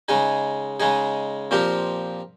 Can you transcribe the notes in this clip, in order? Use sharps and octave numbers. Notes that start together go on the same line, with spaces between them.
C#3 G#3 D#4 G#4
C#3 G#3 D#4 G#4
A#2 F3 C4 G4 A#4